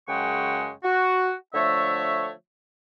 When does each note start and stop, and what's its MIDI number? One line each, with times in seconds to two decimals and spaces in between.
0.08 0.70 42
0.08 0.70 49
0.08 0.70 56
0.08 0.70 78
0.08 0.70 79
0.08 0.70 85
0.83 1.32 66
1.54 2.31 50
1.54 2.31 53
1.54 2.31 57
1.54 2.31 73
1.54 2.31 76